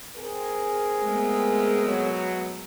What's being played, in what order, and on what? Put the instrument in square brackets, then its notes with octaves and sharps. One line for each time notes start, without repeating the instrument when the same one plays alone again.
[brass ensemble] C4 G#4 A#4
[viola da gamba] G#3 A3 B3
[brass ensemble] B2 F#3